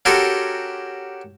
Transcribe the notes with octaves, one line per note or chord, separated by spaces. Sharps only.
C#4 F#4 G4 A4 A#4 C6